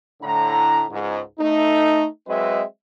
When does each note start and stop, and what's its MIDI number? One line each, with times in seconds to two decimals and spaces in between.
0.23 0.84 45
0.23 0.84 50
0.23 0.84 82
0.90 1.20 37
0.90 1.20 44
1.40 2.06 57
1.40 2.06 63
2.27 2.62 54
2.27 2.62 56
2.27 2.62 60
2.27 2.62 71
2.27 2.62 75
2.27 2.62 76